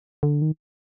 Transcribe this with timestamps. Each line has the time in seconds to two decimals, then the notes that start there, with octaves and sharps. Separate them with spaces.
0.23 D3
0.42 D#3